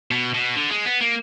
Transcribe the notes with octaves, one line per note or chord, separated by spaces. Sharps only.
B2
B2
D3
G#3
B3
A#3